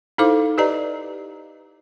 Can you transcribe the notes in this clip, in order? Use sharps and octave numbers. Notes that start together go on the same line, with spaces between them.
D#4 E4 A4 C5 F5 D6
G4 B4 D5 D#5 A#5